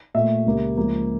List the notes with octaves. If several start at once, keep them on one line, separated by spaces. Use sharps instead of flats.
A#2 A3 E5
C#2 C#3 G3 A#3
C#2 C#3 F3 A#3